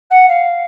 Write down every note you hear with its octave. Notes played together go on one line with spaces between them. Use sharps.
F#5
F5